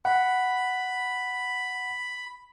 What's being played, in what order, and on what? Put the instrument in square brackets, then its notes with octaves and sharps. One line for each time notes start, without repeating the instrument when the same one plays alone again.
[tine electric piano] F#5 [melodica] B5